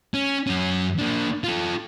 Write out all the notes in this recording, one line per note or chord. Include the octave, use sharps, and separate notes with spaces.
C#4
F#2 C#4
A#3 D4
F4 A4